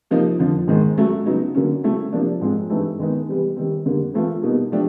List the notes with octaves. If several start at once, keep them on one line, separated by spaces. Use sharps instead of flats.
C3 F3 A#3 D#4
F2 D3 F3
G#2 D#3 G#3
F#3 A3 C#4
C#3 F#3 B3 D#4
D3 F#3 A#3 C#4
C#3 F#3 A3 C4 E4
C3 F3 A#3 D4
G#2 F3 G#3 C4
G2 E3 A3 C4 D#4
D#3 G#3 B3 D#4
C3 E3 G3 B3
D#3 G3 C4
F2 D3 G3 A#3
E3 A3 C4 F4
B2 G3 A#3 D#4
F3 A3 D4 G4